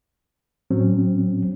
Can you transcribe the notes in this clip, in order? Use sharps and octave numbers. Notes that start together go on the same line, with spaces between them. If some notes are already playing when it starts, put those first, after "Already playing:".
A2 F#3 C4 C#4